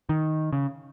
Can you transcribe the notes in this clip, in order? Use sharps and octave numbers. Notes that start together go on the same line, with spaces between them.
D#3
C#3